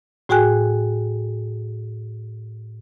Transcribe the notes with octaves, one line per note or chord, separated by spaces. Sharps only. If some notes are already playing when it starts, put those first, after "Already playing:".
A2 F#4 G#4 G5 G#5 F#6